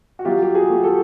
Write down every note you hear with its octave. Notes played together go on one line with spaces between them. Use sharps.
F#4
F#3 F4 G4
G4
F#4 G#4
A3
G4 A4